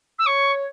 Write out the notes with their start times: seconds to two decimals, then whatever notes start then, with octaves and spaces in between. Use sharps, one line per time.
0.19 E6
0.26 C#5 C#6